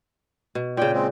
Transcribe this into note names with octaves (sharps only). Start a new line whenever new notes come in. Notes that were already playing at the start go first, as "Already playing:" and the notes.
B2
A#2 C#3 G5
G#3 C4